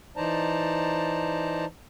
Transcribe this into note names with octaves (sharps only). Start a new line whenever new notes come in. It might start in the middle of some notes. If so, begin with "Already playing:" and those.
E3 D#4 C5 D5 A5 A#5